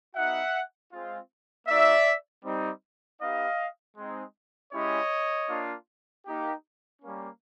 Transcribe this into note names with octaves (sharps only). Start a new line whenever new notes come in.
B3 D#4 F#4 E5 F#5
G#3 C4 F4
A#3 D#4 F#4 D5 E5
G3 C4 D#4
B3 D#4 G4 D#5 F5
G#3 C4 D#4
G#3 C#4 E4 G4 C#5 D#5
A#3 D4 F4
A#3 D#4 G4
G3 A#3 C#4